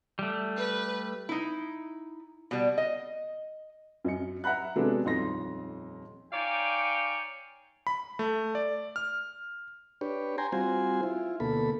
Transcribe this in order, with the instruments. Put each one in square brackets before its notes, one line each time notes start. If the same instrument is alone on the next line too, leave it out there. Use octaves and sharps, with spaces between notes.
[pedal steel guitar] G3 A3
[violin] B4
[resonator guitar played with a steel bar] D#4 E4
B2 G3
D#5
[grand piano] F#2 D#5 C#7
E5 F#5 A#5 B5 F#6
C3 F#3 G#3 B3 D4 A4
D#1 F2 D#4 C6 A#6
[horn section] D#4 C#5 D5 F5 G5 G#5
[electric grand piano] B5
A3
D5
F6
[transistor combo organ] D4 G4 B4 C#5
G5 G#5 A#5 C6
G3 C4 F4 F#4 C5 G#5
E4 F4
D2 B2 A#3 A4 B5